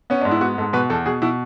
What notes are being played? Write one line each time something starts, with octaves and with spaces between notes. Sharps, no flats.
B3 C#4
G#2 D4
E4
B3 F#4
G#2 A4
B2 B4
E2 A4
B2 G#4
B2 E4